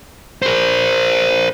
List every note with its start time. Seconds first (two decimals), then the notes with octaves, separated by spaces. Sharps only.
0.42 A#4 C5